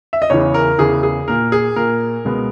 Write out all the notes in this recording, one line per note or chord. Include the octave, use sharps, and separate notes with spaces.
E5
D#5
E2 C#3 E3 C#5
A#4
E2 C#3 E3 G#4
G#4
A#2 A#3 A#4
G#4
A#2 A#3 A#4
C#2 B2 G#3 B3